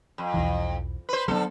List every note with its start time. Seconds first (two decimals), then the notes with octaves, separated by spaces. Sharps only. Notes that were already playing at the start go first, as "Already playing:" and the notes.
0.18 F2
0.34 B1 E2 E3
1.09 B4 C5
1.28 D3 F#3 A3 B3 A4